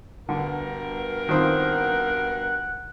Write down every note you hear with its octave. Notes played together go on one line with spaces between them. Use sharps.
G2 B2 D3 A#4
D#3 F3 C4 F#5